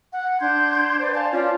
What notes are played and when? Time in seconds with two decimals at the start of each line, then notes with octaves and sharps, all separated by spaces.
0.13 F#5
0.40 D4 C6 G6 G#6
0.99 B4 C5 D5
1.14 F5 G#5 A5
1.32 C#4 F4 D5